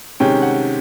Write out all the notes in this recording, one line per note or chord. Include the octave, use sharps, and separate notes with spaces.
C3 D#3 G#3 C#4 G5
F#5